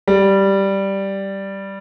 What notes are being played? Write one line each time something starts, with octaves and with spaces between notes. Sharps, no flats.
G3